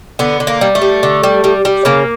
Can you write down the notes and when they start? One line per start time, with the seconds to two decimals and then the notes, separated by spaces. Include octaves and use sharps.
0.19 D3 B3
0.40 D3
0.47 A#3
0.61 G3
0.75 A3
0.82 G3
1.03 D3
1.23 G3
1.44 G3
1.65 G3
1.85 C#3 A#3